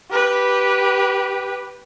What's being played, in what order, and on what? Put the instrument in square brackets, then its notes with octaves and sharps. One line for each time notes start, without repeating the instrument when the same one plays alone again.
[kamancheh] G4 B4